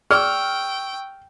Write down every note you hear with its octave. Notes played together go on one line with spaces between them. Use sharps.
G#4 D5 G5 C#6 E6 F6